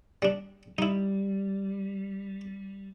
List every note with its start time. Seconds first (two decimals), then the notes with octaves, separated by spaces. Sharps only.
0.22 G3 D4
0.78 G3 D#4 E4